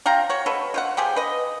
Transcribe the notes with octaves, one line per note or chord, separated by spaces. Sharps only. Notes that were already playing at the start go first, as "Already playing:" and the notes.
F4 F5 G5 A#5
F#4 C#5
B2 A4 B4
F4 C5 F#5
F3 G4 G#4 C5
B4 D#5